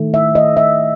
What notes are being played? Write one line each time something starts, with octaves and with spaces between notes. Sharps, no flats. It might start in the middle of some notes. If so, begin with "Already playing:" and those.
Already playing: D#3 A3
E5
D#5
E5